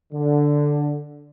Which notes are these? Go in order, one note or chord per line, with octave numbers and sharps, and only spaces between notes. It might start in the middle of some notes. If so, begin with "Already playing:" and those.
D3